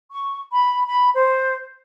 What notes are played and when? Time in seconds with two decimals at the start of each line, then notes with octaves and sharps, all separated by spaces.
0.11 C#6
0.52 B5
0.87 B5
1.15 C5